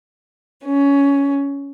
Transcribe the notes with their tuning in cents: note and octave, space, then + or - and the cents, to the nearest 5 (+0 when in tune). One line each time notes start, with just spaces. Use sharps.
C#4 +15